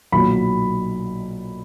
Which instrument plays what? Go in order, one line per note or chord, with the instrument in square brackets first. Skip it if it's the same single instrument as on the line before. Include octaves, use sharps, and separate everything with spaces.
[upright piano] B1 A#2 F#3 B5